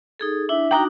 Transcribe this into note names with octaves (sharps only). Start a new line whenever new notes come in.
D#4 G#4 A4
D4 E4 E5
D4 D#4 F#4 G5 A#5